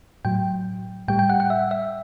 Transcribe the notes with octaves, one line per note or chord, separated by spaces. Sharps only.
A2 F#3 G5
A2 G3 G5
G5
F#5
F#5
E5
E5